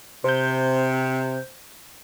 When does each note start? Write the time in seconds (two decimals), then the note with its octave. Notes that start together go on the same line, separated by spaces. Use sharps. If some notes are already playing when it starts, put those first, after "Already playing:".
0.24 C3 C5 G6